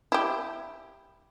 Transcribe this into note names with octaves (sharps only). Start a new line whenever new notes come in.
E4 G4